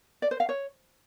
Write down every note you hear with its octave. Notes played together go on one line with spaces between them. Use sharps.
D5
C5
F5
C#5